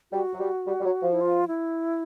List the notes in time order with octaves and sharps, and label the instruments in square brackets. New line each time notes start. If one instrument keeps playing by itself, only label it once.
[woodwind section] G3 [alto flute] F#4
[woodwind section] F#3
G3
G3
G3
F#3
F3
[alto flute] E4
F4
E4